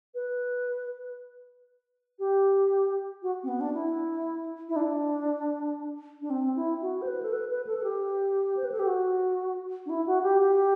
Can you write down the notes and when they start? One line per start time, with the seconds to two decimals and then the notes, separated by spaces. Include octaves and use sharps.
0.14 B4
2.19 G4
3.22 F#4
3.43 C4
3.48 B3
3.60 D4
3.74 E4
4.69 E4
4.76 D4
6.22 D4
6.30 C4
6.56 E4
6.81 F#4
7.02 C5
7.07 B4
7.22 A4
7.33 B4
7.50 B4
7.67 A4
7.78 A4
7.83 G4
8.57 C5
8.64 B4
8.72 A4
8.79 G4
8.86 F#4
9.86 D4
9.89 E4
10.06 F#4
10.23 G4
10.40 G4